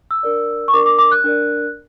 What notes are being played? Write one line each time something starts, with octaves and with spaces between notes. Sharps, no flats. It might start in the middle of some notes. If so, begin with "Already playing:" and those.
E6
D4 A#4 D5
C#6
D4 A#4 D5 D6
D6
D6
F#6
D4 A#4 D5